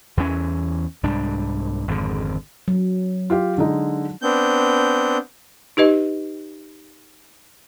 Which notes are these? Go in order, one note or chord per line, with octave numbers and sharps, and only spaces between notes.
E2 E3 B3 C#4
C2 G#2 G3 D4
G#1 F2 G#2 D3
F#3
F4 G4 F5
D3 G#3 D#4
B3 C4 D4 G6
D#4 G4 B4 D#5